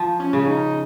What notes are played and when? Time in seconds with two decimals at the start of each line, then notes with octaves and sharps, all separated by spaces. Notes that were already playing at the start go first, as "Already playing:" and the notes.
Already playing: F3
0.20 C#4
0.33 C#3
0.46 D#4